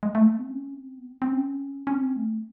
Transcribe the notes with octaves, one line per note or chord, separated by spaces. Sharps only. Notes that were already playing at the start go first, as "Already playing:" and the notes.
G#3
A3
A#3
C4
C#4
C4
B3
C4
C4
C#4
C#4
C4
A3